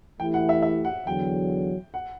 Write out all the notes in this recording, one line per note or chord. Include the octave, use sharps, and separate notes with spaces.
E3 A3 E4 G4 G5
F#5
E5
E5
F#5
E2 D3 F#3 G5
F#5